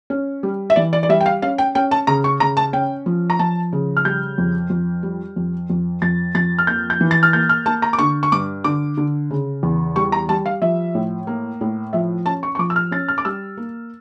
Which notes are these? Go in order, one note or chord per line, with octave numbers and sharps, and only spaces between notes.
C#4
G3
E5
E3 D5
D5
D5
G3 E5
G5
F5
C#4 F5
G5
C#4 G5
A5
C#3 A#5
C#6
C#3 A#5
A5
C#4 G5
F3
A#5
F3 A5
C#3
F6
G3 G6
F2
F2
G3
F2
F2
F2 A6
F2 A6
F6
A#3 G6
G6
E3
A6
F6
A#3 G6
F6
A#3 A5
A#5
D6
D3 C#6
C#6
G2 D6
D3 D6
D3
C#3
E2
G3 C#6
A#5
G3 A5
F5
F3 E5
A2
A#3
A2
F3 E5
C#4 A5
C#6
C#6
F3 D6
E6
F6
C#4 A6
F6
D6
G3 E6
A#3